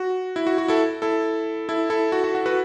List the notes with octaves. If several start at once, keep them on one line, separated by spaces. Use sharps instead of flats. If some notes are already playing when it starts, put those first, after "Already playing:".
Already playing: F#4
E4
F#4
F#4
E4 A4
E4 A4
E4 A4
E4 A4
F#4
F#4
F#4
F#4 B4